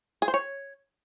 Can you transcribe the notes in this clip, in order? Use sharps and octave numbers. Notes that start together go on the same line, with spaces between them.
G#4
C5
C#5